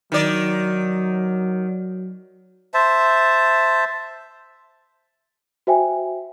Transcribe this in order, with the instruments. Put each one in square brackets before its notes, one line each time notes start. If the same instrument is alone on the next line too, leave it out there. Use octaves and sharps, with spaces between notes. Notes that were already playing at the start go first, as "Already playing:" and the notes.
[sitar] D#3 D5 [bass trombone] F#3
[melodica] C5 E5 A5
[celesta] F#4 C5 E5 G5 G#5